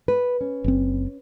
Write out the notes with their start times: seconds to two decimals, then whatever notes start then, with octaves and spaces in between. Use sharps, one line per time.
0.08 B4
0.41 C#4
0.64 F#1 C4